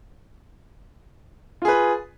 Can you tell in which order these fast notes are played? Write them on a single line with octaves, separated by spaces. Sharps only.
F4 G#4 B4